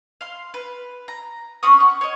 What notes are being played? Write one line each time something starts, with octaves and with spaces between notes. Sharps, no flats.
F5 C6
B4
A#5
C4 C#4 C#6 D#6
F#5
C#5 D#5